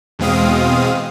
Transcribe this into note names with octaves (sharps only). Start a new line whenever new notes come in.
E2 B2 G#3 C4 F5 D#6